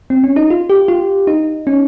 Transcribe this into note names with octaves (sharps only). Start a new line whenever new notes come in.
C4
C#4
D#4
F4
G4
F4
D#4
C#4